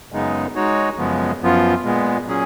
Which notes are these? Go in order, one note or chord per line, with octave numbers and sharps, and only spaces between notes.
F#2 C#3 G#3 B3 D#4
G#3 D#4 F#4 C#5
F#2 C#3 F3 G#3 B3
F#2 F3 B3 F4
A#2 G#3 B3
A#2 F#3 C#4 G#4